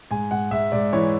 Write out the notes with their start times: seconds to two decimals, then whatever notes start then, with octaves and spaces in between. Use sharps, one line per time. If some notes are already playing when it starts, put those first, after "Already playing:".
0.11 G#2 G#5
0.31 G#2 F#5
0.51 G#2 E5
0.72 G#2 D5
0.93 E3 C#5